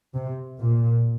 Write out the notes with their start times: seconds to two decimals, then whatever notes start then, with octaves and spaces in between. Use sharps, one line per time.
0.15 C3
0.60 A#2